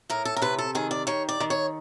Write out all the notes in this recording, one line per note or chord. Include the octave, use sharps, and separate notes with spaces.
A2 A#4
A4
A#4
C3 B4
A4
D#3 G#4
D5
D#3 C#5
D5
D#3
C#5